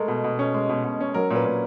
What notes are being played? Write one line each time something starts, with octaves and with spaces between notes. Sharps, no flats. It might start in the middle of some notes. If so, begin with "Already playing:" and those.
Already playing: G#3 A3 A#4
B2
B2
C#4
G#3
B2
B2
C#4
F#3 A#4
A#2 B4
A#2